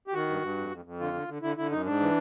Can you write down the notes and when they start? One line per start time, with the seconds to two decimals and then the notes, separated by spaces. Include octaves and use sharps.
0.07 G4
0.13 D#3 F#4
0.29 G2
0.42 G2
0.57 F2
0.71 F2
0.85 F2
1.00 D3 F4
1.13 D3
1.28 D3
1.42 D3 E4
1.57 D3 E4
1.71 F#2 D#4
1.85 G#2 D4
2.00 E3